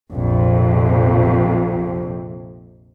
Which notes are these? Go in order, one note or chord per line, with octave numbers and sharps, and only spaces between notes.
A#1 F2 C3